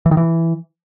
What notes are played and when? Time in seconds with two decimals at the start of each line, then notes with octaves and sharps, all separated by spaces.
0.06 E3
0.11 D#3
0.17 E3